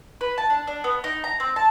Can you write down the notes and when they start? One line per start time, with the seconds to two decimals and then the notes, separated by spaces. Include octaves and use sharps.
0.21 B4
0.38 A5
0.50 D4
0.67 D4
0.84 B3
1.04 D#4
1.24 A#5
1.40 C4
1.56 A5